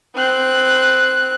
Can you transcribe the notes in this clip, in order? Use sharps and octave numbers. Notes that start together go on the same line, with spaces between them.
C4 F#6